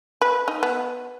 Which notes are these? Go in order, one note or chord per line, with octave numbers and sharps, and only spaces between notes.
B4
D#4
B3